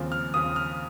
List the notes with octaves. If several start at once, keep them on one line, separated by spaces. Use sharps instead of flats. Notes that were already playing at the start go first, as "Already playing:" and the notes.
Already playing: D#2 C#3 F3 C4
F6
D#2 C#3 F3 C4 D#6
F6